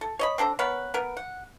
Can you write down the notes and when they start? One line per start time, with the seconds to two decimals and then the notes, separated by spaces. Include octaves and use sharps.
0.01 A4
0.19 C#5 D#5 B5
0.38 C4 D4 A4 A#5
0.59 B3 A#4 B4 C#5
0.94 B3 A#4 B4
1.17 F#5